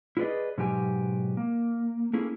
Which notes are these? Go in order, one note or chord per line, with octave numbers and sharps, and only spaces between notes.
E4 F4 G#4 B4 D5 D#5
G#2 B2 F#3 G4 G#5
A#3
A#3 C#4 E4 G#4 A4